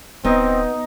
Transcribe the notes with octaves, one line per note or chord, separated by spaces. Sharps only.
D1 B3 C4 D#4 D#5